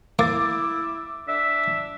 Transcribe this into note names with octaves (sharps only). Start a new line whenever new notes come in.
A#3 E4 D6 A6
D4 E5